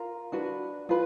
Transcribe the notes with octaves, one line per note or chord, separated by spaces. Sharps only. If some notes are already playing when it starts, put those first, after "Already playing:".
Already playing: F4 A#4 A#5
D4 F#4 B4
F4 B4